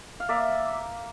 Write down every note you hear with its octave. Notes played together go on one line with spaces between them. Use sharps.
F5
A#3 D5 E5